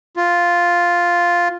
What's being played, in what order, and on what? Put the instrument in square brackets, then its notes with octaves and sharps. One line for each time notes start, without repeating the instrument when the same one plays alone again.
[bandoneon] F4